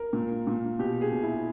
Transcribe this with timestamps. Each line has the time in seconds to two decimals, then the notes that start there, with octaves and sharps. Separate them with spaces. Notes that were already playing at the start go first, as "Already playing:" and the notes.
Already playing: A#4
0.13 A#2
0.47 A#2
0.79 B2 G4
1.01 G#4
1.12 B2
1.23 E4